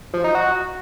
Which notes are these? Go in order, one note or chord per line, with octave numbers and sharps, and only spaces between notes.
F3
D#4
F#4